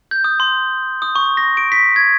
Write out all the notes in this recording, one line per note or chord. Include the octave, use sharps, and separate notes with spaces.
G6
D#6
C6
D#6
C#6
A#6
D7
B6
G#6